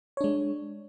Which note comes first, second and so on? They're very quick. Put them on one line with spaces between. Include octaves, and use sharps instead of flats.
C#5 D4 G#3